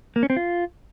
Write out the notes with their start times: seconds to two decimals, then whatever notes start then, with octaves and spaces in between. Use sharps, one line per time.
0.16 A#3
0.23 C#4
0.30 C4
0.37 F4